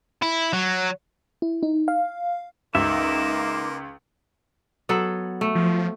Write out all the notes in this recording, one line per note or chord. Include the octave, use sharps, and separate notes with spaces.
E4
F#3
E4
D#4
F5
C#2 A#3 D#4 E5 C6 D6
F#3 B3 A4
A3
F3